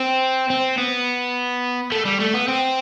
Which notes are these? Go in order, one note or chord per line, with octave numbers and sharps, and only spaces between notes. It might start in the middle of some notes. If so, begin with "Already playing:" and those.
Already playing: C4
C4
B3
A3
G3
A3
B3
C4